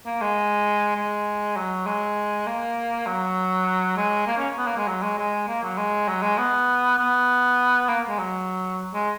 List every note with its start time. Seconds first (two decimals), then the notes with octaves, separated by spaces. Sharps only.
0.06 A#3
0.21 G#3
0.96 G#3
1.57 F#3
1.86 G#3
2.47 A#3
3.07 F#3
3.98 G#3
4.27 A#3
4.38 C#4
4.58 B3
4.67 A#3
4.77 G#3
4.88 F#3
5.03 G#3
5.18 G#3
5.48 A#3
5.64 F#3
5.78 G#3
6.09 F#3
6.23 G#3
6.38 B3
6.98 B3
7.89 A#3
8.09 G#3
8.19 F#3
8.94 G#3